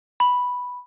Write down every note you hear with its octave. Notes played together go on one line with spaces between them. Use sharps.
B5